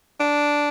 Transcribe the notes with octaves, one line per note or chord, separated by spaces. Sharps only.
D4